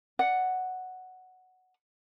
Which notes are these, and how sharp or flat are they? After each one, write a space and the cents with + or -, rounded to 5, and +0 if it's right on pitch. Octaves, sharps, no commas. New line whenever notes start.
D5 +0 F#5 +0